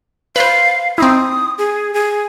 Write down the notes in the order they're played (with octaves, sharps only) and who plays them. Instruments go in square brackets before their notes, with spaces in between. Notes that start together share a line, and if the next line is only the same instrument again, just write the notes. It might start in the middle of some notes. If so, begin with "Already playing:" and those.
[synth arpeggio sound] B4 C5 [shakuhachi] F5
[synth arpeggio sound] C4 D#4 E4 [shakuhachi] D#6
[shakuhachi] G#4
G#4